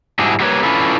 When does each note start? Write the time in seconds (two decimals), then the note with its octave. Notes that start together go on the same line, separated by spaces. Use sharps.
0.19 G#2 G3 D4 E4 F#4 G#4
0.40 F#3 G3 A3 A#3 B4 C#5
0.63 C#4 D4 E4 F4 A4 B4